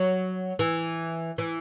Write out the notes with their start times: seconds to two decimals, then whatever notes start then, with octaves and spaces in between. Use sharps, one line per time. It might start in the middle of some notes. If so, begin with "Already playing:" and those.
Already playing: F#3
0.59 E3
1.38 E3